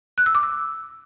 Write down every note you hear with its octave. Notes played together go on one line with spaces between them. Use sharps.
F#6
E6
D6
E6